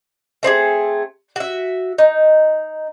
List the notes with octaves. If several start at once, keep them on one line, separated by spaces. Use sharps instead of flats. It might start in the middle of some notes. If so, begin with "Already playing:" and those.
A3 C4 E4 G#4
F#4 E5
D#4